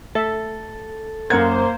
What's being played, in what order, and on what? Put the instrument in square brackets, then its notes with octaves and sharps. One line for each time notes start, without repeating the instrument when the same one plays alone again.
[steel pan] A3 E5 [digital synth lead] A4
[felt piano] F#2 G#6 [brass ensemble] A#3 C5 [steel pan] A#4 F#5